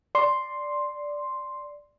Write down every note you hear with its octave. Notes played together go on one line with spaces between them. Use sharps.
D5 C6